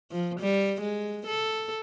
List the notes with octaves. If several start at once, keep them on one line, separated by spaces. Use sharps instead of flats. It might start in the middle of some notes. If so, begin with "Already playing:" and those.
F3
G3
G#3
A4